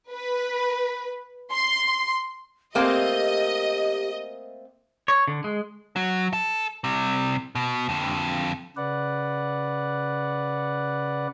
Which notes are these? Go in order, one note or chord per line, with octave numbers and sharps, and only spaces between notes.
B4
C6
A3 A#3 C4 G4 D#5
C#5
D3
G#3
F#3
A4
C3 G3
B2
F2 D3
C#3 B4 D5 F#5